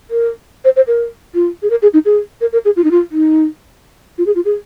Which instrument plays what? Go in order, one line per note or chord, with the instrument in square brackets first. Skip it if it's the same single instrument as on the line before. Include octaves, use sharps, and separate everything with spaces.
[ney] A#4
C5
C5
A#4
F4
G#4
A#4
G#4
D#4
G#4
A#4
A#4
G#4
F4
D#4
F4
D#4
F4
G#4
F4
G#4